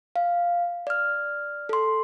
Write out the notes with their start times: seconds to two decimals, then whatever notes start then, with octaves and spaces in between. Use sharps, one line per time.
0.16 F5
0.87 D5 F6
1.69 A4 C6